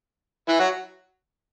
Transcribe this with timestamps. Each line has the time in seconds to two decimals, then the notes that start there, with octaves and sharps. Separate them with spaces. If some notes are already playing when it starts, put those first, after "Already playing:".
0.48 E3 E4
0.59 F#3 F#4